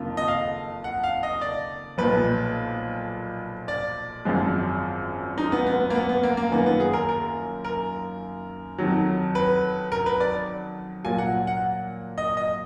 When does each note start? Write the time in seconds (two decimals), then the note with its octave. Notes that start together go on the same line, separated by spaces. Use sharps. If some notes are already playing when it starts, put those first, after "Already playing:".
Already playing: F#1 F2 D#3 A#3 F4
0.17 D#5
0.28 F5
0.84 F#5
1.04 F5
1.23 D#5
1.41 D5
1.98 B1 A#2 F3 B4
3.68 D5
4.25 G#1 F#2 F3 G#3
5.38 D#4
5.52 B3
5.66 B3
5.80 B3
5.90 A#3
5.95 B3
6.09 B3
6.23 A#3
6.37 A#3
6.52 F#2 D#3 A#3 B3 F4
6.66 B3
6.80 G#4
6.93 A#4
7.09 A#4
7.65 A#4
8.78 F2 D#3 F#3
9.35 B4
9.92 A#4
10.06 B4
10.20 D5
11.04 A#2 F#3 A#3 F4 G#5
11.18 F#5
11.47 F#5
12.18 D#5
12.37 D#5